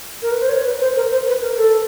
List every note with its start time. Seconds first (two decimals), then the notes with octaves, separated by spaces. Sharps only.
0.22 A#4
0.32 B4
0.40 C5
0.49 C#5
0.65 B4
0.81 C5
0.96 A#4
1.11 C5
1.27 B4
1.42 A#4
1.58 A4